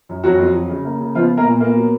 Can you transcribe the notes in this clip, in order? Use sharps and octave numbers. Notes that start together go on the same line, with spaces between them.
F#2
F2 F#3 F#4
F2
F#3
C#3
A#3
C#3
F3 B3 F4
B3
A#3 A#4
A#2
A#3 B3 A#4
F#3